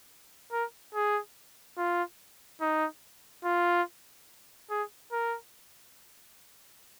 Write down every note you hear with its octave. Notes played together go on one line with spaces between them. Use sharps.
A#4
G#4
F4
D#4
F4
G#4
A#4